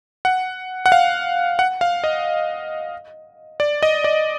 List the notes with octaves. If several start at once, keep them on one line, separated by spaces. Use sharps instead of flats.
F#5
F#5
F5
F#5
F5
D#5
D5
D#5
D5